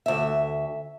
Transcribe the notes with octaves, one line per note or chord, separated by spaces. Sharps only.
D2 E5